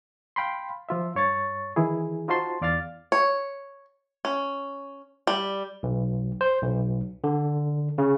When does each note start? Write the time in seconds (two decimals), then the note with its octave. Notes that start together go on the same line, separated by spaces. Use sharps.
0.36 F5 G5 B5 C6
0.89 F3 F4 E5
1.15 G2 C#5 C#6 A6
1.76 D#3 E3 E4 G#4
2.28 D#4 F4 F#4 C5 A5 C6
2.61 E2 D5 F5 F6 A6
3.12 C#5
4.25 C#4
5.27 G3
5.83 B1
6.41 C5
6.62 B1
7.24 D3
7.98 C#3